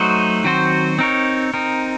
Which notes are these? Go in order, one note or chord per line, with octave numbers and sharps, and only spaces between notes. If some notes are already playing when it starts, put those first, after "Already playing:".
Already playing: F#3 A3 D#4 F#4 C5
D#3 F#3 C4 F#4 C5
C4 D#4 A#4 C#5
C4 D#4 A#4